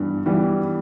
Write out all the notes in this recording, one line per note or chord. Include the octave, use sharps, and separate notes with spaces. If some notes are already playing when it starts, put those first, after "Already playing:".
Already playing: G2 E3 G3 B3
E3 G3 B3